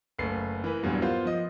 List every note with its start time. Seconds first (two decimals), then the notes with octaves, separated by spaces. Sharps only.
0.19 F#1 A3 B4 C7
0.64 E3 A#4 B4
0.83 E2 G2 A#2 E3 F#3 G3
1.02 A#3 B3 F4 C5
1.25 F3 D#5